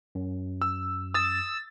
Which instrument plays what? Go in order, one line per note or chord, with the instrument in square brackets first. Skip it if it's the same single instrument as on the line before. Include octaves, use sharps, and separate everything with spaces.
[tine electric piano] F#2
[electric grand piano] E6
[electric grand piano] D#6 A6 [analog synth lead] E6